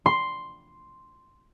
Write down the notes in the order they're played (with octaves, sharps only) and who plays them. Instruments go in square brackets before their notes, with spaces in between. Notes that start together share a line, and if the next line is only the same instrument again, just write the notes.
[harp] C6